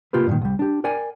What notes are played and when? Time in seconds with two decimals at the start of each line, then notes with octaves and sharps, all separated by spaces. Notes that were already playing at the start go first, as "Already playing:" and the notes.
0.13 C3 A#3 F4 G4 B4
0.27 G2 A#2 D#3
0.41 C2 G3
0.59 D4 G4
0.84 A#4 D5 G5 G#5